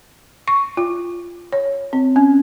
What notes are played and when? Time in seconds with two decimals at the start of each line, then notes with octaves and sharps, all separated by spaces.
0.48 C#6
0.77 F4
1.52 C#5
1.93 C4
2.16 C#4